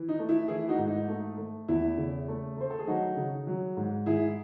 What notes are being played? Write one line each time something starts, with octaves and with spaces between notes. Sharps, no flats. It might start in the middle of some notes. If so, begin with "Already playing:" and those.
Already playing: E3
D#4
A3
E4
E3 E4 G#4
D#4 F#4
G#2
D#4
A3
A3
E2 E4
C#3
A3
A3 C5
A4
G#4
F#3 D#4 F#4
C#3
F#3
G#2
G#2 E4 G#4